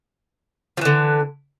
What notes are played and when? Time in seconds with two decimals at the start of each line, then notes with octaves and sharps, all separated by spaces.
0.77 F3
0.81 E3
0.85 D3